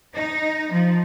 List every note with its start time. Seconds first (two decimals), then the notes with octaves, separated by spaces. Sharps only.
0.14 D#4
0.71 F3